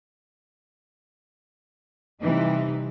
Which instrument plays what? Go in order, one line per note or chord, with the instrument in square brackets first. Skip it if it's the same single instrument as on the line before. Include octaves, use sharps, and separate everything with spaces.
[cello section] C3 E3 G3 D#4